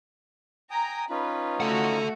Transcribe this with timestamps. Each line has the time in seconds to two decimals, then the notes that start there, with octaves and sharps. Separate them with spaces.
0.70 G5 G#5 A#5 D#6
1.10 C#4 D#4 F4 B4
1.60 A3 F#4 A4 F#5